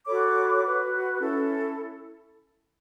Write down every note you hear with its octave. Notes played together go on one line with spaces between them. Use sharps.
F#4 A4 C#5 B5 D6
F#4 B4
C#4 E4 A4